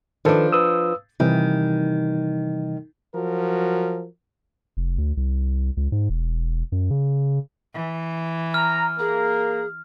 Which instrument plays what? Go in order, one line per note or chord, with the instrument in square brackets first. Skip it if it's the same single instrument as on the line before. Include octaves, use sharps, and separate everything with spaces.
[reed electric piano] D#3 A4 B4 [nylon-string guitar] F3 D4
[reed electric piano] B4 D#6 E6
[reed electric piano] C3 E3 G3 [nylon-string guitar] D#3
[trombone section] F3 F#3 F#4 A#4
[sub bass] F1
D2
C2
C#2
G#2
E1
F#2
C#3
[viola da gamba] E3
[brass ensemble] A#5 [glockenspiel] F6
[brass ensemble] A#3 A#4 [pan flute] G#4